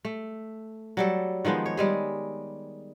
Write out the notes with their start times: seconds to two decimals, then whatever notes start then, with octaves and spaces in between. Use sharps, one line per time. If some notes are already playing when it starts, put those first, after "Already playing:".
0.05 A3
0.97 F#3 G3 A4
1.45 D#3 F3 G#3 B3
1.66 C#5
1.77 G3 G#3 G#4